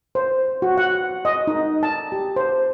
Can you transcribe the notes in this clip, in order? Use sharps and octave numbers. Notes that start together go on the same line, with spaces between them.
C5
F#4
F#5
D#5
D#4
A5
G4
C5